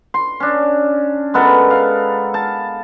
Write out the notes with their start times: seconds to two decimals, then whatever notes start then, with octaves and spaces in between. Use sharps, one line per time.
0.14 C6
0.40 C#4 D4
1.34 G#3 B3 A4 A#4
1.71 F5
2.34 A5